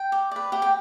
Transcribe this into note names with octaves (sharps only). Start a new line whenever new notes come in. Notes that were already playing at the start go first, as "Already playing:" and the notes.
Already playing: G5
G4
B4 D5
G4 F#5
G5